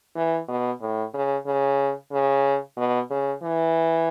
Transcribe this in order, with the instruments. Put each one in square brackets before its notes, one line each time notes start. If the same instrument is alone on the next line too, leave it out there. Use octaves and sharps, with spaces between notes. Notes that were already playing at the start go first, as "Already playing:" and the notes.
[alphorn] E3
B2
A2
C#3
C#3
C#3
B2
C#3
E3